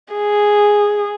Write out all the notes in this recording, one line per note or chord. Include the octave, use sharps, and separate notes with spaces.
G#4